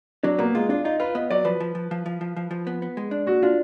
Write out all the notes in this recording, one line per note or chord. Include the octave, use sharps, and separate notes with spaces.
F#3 D4
A#3 B3
G#3 F4
D4 F4
D#4 F4
F4 B4
B3 D#5
F#3 D5
F3 B4
F3
F3
F3
F3
F3
F3
F3
B3
B3
G#3
D4
A#2 F#4
D4 F4